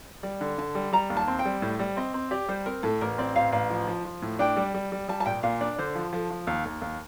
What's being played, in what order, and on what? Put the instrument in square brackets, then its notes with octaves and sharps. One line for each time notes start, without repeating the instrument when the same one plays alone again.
[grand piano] G3 [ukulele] D5
[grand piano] D3
[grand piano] D3 [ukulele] A5
[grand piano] G3
[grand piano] G3 [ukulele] A#5
[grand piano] D#2
[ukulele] A5
[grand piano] C4
[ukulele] G5
[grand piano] G3
[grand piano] A2 [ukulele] C5
[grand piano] G3
[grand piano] C4 [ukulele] D#5
[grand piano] C4
[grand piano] G4 [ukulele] D5
[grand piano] G3 [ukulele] C5
[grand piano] C4 [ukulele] A#4
[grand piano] A2 [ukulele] A4
[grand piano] A1 [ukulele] A#4
[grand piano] C4 [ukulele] D5
[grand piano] A1 [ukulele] F5
[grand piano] A1 [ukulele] F5
[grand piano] F3
F3
F3
A2
[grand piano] D4 [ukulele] G5
[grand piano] G3
G3
G3
[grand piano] G3 [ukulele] A5
[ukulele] A5
[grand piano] A#1 [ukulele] G5
[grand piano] A#2 [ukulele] F5
[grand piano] D4 [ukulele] D5
[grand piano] D3 [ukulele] C5
[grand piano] F3
[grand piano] F3 [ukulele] A4
[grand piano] F3
D#2
D#2
D#2